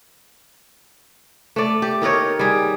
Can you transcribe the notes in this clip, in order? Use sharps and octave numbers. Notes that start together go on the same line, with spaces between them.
A3 D5
G4
D#3 D#4 A#4 C#5
G3 G#4